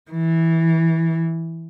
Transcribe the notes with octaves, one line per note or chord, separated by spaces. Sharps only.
E3